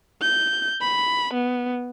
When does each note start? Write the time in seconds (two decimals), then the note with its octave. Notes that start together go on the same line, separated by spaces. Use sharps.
0.21 G6
0.81 B5
1.34 B3